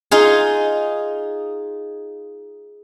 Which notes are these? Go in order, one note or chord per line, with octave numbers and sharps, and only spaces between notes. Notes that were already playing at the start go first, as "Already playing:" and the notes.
D#4 F4 G#4